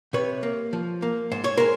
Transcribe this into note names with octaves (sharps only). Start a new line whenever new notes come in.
C3 B4 C#5
A#3
F3
A#3
G#2 C5
C#5
G#3 A#4 C5